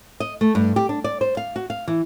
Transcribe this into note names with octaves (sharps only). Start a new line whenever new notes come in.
D#5
A3
G2
G4
D4
D5
C5
F5
F#4
F5
E3